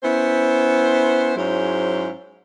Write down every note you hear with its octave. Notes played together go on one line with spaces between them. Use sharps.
B3 C#4 E4 C5
G#2 F#3 G#3 C#4 E4 C5